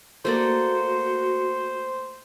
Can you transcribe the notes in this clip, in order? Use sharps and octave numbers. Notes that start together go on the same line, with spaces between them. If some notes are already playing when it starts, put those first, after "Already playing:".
A3 A#3 F#4 C5 D5